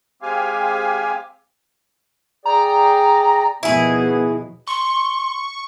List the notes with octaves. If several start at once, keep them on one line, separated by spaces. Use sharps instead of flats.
G#3 C4 G4 F5 G#5
G#4 D5 G5 A#5
D#2 B2 F3 B3 E4 G#4
C6 C#6